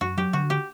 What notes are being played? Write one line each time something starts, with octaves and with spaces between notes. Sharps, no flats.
F#2 F#4
F#3 G4
D3 F#4
G4